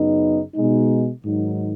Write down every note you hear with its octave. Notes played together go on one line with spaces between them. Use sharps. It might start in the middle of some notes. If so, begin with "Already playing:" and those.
Already playing: F#2 C#3 B3 D#4
B2 G#3 D#4
G#2 D#3 F#3 D#4